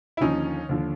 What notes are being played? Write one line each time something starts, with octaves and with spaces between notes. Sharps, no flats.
E4
D#2 D3 F3 C#4 D#4
D#2 D3 F3